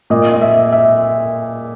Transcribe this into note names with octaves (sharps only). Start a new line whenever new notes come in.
A#2 D#5
D#5
E5
E5